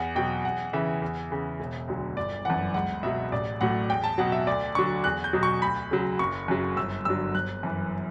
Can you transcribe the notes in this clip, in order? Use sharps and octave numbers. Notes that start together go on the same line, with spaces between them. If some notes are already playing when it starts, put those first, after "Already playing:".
Already playing: E2 F#5
B2 F#3 G5
E2 F#5
C#3 E3 E5
E2
C#3 E3
E1
D2 D3 F#3
G1 D5
F#2 E3 F#5
C#2 F#5
B2 F#3 E5
A1 D5
A2 F#3 F#5
E2 G5
A5
B2 F#3 F#5
E5
D2 D5
D3 F#3 C#6
E2 F#6
G6
B2 F#3
C#6
D2 B5
C#3 F#3
F#1 C#6
F#2 C#3 F#3
G1 E6
G2 D3 F#3 E6
G1 F#6
F#2 E3